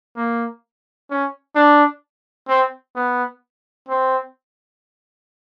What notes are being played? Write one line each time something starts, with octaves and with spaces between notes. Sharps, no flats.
A#3
C#4
D4
C4
B3
C4